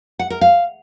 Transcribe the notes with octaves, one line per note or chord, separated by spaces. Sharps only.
F#5
A#4
F5